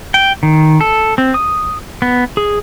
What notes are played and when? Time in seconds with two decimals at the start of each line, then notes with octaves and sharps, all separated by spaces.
0.14 G5
0.43 D#3
0.81 A4
1.18 C4
1.34 D#6
2.02 B3
2.37 G#4